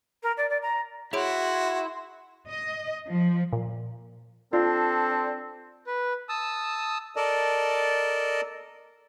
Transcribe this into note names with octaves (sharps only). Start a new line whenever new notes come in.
A#4
D5
D5
A#5
E4 F#4 G#4 C#5 C6 D7
D#5
F3
A#2
C4 D4 F4 A4
B4
A5 D#6 E6
A4 A#4 D5 D#5 A5